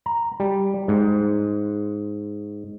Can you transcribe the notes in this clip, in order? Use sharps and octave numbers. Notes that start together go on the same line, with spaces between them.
A#5
G3
G#2